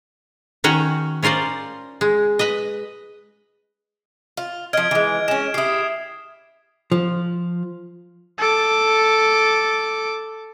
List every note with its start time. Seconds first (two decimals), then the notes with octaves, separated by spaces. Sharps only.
0.64 D#3 C#4 F#4 G5
1.23 C#4 F4 A#4 C5 D5
2.01 G#3
2.39 B4 D#5
4.37 F4
4.73 F3 D#5 F6 G#6 D7
4.91 E3 G#3
5.28 G#3 C#4 E7
5.54 E4 G4 D#6 C7
6.92 F3
8.38 A4 D6